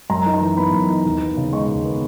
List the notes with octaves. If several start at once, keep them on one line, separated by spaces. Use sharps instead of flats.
F#2 A#5
D#4
A#5
E3
B3 B5
F#2
D#4
D#2
B3
C#3
G#3 C#6
D#2
B3